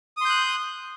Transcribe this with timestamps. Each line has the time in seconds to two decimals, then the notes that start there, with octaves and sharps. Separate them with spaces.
0.17 D#6
0.21 C6
0.25 G6
0.29 F#6